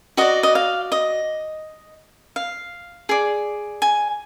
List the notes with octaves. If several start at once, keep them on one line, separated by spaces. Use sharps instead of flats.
F#4 D5 D#5
D#5
F5
D#5
F5
G#4 D5
G#5